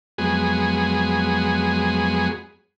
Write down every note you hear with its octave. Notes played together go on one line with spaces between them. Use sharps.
F2 F#3 G#3 B3 G#4